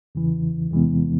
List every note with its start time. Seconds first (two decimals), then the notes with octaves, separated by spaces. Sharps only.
0.15 E2 C#3 E3
0.71 E2 C3 E3 G#3 B3